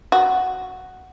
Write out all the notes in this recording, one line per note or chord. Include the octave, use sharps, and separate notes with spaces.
F#4